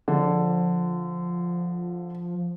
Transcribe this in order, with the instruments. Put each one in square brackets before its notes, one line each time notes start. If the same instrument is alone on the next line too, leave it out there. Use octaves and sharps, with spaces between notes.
[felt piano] D3 [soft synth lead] F3